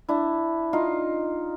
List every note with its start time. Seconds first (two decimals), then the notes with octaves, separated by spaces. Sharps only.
0.09 D4 E4
0.73 D#4 F4